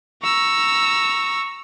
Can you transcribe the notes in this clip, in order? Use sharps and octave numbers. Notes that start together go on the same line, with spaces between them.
A#5 C#6 E6